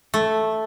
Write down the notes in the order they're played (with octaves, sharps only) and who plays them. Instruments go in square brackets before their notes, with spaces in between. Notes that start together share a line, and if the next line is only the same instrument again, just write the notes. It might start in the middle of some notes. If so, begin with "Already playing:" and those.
[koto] A3